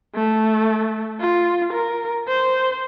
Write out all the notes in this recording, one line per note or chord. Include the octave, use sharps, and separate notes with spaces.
A3
F4
A#4
C5